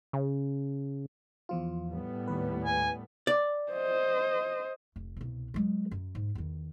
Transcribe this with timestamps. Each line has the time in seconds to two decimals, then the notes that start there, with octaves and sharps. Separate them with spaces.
0.13 C#3
1.49 E2 F3 F4
1.88 A2 G3 B3
2.28 D#2 B4
2.64 G#5
3.27 D5
3.72 C5 D#5
4.96 F1
5.16 C2 B2
5.54 F#3 G#3
5.91 F#2
6.15 G#2
6.35 E2 D#3